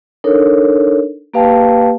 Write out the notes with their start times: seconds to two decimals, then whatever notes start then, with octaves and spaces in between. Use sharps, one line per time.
0.24 D4 D#4 A4 A#4 C#5
1.34 A#3 G4 B4 F5 G5 A5